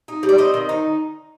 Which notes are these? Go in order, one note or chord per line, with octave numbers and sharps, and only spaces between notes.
D#4
G3
D5
C4 D#5
D#3
D#4